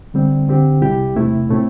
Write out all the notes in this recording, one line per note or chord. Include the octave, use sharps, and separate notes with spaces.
D3 G3 C4
D3 C4 G4
C2 C3 G3 E4 G4
E2 C3 A3 E4
A2 A3 C4 E4